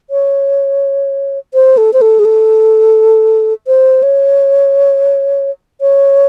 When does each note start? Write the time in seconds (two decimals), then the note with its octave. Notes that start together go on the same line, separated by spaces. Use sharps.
0.10 C#5
1.54 C5
1.77 A4
1.93 C5
2.01 A4
2.19 G#4
2.25 A4
3.67 C5
4.03 C#5
5.81 C#5